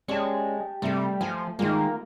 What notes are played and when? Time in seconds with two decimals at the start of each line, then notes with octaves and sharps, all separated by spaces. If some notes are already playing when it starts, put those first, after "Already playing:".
0.08 G#3 C#4 G4 D5 A5 C#6
0.82 C3 G3 A3 A4
1.21 F3 G#5
1.59 D#3 G#3 A#3 F4